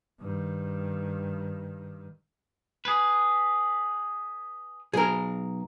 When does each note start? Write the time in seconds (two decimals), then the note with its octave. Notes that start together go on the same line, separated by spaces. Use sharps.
0.21 G2 D#3
2.85 G#4 B4
4.93 B1 G#4 A#4